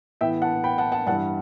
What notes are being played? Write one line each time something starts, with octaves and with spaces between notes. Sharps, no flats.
A2 E3 B3 E5 G5
F#5 A5
G5 B5
F#5 A5
F#5 A5
G2 E3 G3 F#5 A5